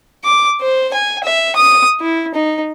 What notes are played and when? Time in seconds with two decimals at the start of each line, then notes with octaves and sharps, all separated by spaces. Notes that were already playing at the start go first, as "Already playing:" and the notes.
0.24 D6
0.61 C5
0.94 G#5
1.24 E5
1.56 D#6
2.01 E4
2.34 D#4